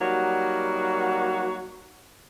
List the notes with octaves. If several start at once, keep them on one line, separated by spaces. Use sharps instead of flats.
F#3 G3 A#3 D#4 F#4